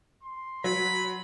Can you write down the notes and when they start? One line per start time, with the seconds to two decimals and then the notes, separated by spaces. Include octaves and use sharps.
0.23 C6
0.64 F#3 B5